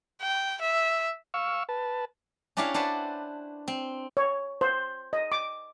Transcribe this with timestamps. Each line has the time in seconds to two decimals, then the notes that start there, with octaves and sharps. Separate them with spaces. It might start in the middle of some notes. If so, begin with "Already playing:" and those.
0.21 G5
0.61 E5
1.34 F5 C#6 E6
1.69 B4 A5
2.57 C#4 D4 E4 G4 C#5 F5
2.74 D4 B4 C5 F#5 A5
3.68 C4
4.17 C#5
4.61 C5
5.13 D#5
5.32 D6